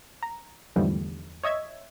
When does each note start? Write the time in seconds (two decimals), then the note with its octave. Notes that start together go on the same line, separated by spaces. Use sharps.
0.23 A#5
0.76 E2 G#2 D3 F3 G3 A3
1.43 C#5 D#5 E5 G#6